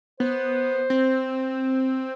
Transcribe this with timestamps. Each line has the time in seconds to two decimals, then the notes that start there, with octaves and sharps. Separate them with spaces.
0.20 B3 C5
0.90 C4